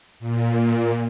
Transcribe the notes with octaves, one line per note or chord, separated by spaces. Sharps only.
A#2